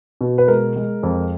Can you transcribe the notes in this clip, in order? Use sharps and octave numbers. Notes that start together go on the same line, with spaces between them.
B2
B4
G#3 A#4
G#3
F2